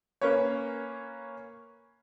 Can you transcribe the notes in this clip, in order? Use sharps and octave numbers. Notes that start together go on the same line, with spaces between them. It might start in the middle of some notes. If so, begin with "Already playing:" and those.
A#3 C#4 B4 C#5